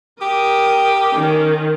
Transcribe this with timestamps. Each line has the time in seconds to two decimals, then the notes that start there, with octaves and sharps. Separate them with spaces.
0.21 G4 A#4 D#6
1.14 D#3 C#4